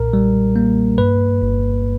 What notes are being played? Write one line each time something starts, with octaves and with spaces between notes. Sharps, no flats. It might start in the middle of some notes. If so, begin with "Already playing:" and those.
Already playing: B1 A#2 A#4
G3
A#3
G2 B4
G1